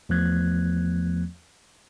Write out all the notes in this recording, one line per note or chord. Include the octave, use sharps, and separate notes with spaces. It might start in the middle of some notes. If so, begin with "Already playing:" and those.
E2 F3 A3 B3 F#6 G#6